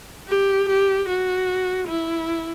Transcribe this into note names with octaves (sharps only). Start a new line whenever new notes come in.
G4
G4
F#4
E4